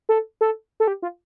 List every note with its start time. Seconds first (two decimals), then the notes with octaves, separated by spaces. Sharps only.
0.09 A4
0.41 A4
0.80 A4
0.87 G4
1.02 F4